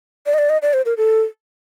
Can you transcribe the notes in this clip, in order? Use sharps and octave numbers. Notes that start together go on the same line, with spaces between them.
D5
D#5
D5
D#5
D5
C5
A#4
A4